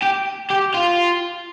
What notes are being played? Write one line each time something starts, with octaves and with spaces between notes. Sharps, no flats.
G4
G4
F4